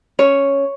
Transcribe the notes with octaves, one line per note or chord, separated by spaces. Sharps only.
C#4 C#5